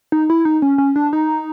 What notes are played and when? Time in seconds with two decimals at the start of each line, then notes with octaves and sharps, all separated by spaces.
0.12 D#4
0.30 E4
0.45 D#4
0.62 C#4
0.78 C#4
0.96 D4
1.13 D#4